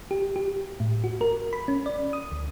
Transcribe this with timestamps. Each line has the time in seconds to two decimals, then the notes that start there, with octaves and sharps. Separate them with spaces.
0.11 G4
0.36 G4
0.80 A2
1.04 F#4
1.21 A#4
1.53 B5
1.68 C#4
1.86 D5
2.13 D#6
2.32 D2